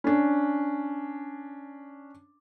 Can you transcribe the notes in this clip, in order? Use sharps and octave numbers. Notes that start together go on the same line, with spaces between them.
C#4 D4